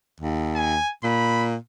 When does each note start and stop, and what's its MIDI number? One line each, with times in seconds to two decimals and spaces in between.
0.20 0.78 39
0.55 0.91 80
1.04 1.56 46
1.04 1.44 83